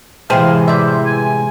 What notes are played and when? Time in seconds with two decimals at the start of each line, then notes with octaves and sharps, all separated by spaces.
0.30 A2 C3 E3 G#3 G4 G#4 C5 F5
0.68 C5 D5 E5
1.06 G#5